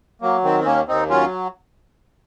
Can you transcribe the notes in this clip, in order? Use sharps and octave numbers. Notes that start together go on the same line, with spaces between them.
F#3 A#3
D#3 C4
C4
D#2 A#3 C#4
D#2 C4 D#4
F#3 C#4 F4